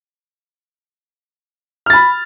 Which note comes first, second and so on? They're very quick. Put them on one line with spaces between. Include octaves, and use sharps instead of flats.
F6 A6 B5